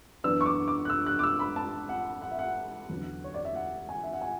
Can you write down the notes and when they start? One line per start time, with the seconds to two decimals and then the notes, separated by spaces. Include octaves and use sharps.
0.24 F#2 E3 B3 D4 E6
0.41 C#6
0.46 D6
0.68 D6
0.85 F#6
0.90 E6
1.06 F#6
1.19 D6
1.23 E6
1.39 B5
1.56 A5
1.89 F#5
2.22 F#5
2.31 E5
2.39 F#5
2.89 E2 D3 F#3 C#4
3.24 C#5
3.34 D5
3.45 E5
3.55 F#5
3.89 G#5
4.03 E5
4.13 F#5
4.21 G#5